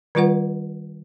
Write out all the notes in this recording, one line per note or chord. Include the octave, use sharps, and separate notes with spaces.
D#3 G3 F4 B4 F#5